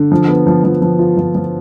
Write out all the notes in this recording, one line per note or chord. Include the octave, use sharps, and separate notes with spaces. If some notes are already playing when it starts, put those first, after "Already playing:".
Already playing: D3
F3
B3
F3
F3
F3
F4
F3
F3